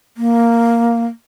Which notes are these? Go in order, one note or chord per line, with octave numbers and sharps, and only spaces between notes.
A#3